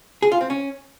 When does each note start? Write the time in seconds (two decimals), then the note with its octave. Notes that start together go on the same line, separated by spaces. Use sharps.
0.22 G#4
0.32 F4
0.41 C4
0.50 C#4